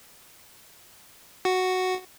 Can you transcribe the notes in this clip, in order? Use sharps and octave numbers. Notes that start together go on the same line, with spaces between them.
F#4